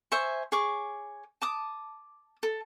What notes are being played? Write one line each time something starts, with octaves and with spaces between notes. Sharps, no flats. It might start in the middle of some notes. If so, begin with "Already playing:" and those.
C5 E5 G#5 C#6
G#4 C#5 C#6 D6
A5 D6 D#6
A4